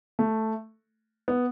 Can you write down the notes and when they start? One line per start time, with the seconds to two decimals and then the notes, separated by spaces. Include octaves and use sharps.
0.19 A3
1.28 B3